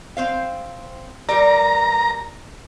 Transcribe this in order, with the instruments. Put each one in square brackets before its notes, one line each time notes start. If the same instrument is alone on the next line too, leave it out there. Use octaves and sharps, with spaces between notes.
[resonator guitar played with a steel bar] C4 C5 F5
[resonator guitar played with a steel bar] G3 A#4 D5 [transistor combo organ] A#5